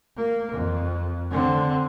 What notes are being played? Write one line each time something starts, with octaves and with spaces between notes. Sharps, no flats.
A#3
F2
D3 C4